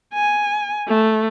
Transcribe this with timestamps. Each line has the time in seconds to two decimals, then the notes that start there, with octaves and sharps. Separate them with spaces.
0.14 G#5
0.88 A3